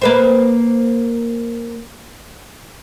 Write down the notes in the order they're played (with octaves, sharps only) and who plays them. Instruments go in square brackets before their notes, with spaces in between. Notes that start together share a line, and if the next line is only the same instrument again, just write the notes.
[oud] A#3 B4 C5